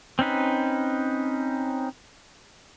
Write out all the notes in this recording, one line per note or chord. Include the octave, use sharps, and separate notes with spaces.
C4 C#4 D#4 B4